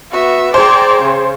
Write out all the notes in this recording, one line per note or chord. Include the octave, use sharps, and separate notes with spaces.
B3 F#4 E5
G#4 C5 D5 G5 A#5
C#3